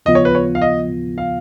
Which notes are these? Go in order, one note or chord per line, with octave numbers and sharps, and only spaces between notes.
D#2 C#3 F3 B3 F4 D#5
C#5
B4
C#5
F5
D#5
F5